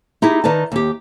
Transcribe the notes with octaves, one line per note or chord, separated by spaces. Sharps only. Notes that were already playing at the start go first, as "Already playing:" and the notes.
D#4 E4 G4 G#4
D#3 D#4 B4 D5 A5
D#2 G4